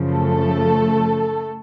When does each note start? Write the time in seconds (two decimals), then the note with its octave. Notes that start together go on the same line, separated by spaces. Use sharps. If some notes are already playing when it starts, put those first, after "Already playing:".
Already playing: F#2 C#3 F3
0.10 A3 A4